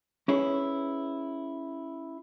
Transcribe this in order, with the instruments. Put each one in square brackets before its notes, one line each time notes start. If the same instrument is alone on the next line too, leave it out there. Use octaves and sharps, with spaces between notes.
[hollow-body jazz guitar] C#4 E4 G#4 B4 C#5